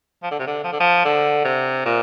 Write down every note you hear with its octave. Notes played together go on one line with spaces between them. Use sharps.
F3
D3
C3
D3
F3
D3
F3
D3
C3
A#2